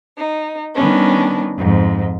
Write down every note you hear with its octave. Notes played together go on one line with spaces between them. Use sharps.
D#4
D#3 G3 B3 C#4 D4
F2 G#2